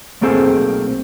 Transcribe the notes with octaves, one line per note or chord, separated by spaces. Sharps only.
B1 A3 A#3 C4 G#4 A4